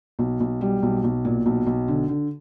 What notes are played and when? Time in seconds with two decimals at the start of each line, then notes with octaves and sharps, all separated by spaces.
0.19 B1
0.40 B1
0.61 G3
0.83 B1
1.04 B1
1.25 A#2
1.46 B1
1.67 B1
1.88 D3
2.09 D3